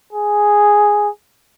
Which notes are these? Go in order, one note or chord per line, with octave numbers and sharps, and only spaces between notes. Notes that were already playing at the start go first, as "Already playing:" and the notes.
G#4